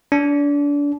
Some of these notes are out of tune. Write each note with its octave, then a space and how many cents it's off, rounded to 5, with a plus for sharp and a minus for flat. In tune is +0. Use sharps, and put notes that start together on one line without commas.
D4 -30